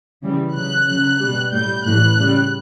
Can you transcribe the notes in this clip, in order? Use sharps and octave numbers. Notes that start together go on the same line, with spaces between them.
C#3 E3 G3
C#3 F#3 F#6
C#3 F#3
B2 G3
A2 G3 G6
A2 E3 G3 F#6
C#3 G3